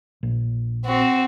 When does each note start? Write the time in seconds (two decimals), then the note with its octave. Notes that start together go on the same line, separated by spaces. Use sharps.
0.23 A#1
0.85 C4 F#4